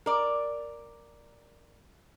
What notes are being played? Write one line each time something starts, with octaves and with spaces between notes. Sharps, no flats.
A#4 D5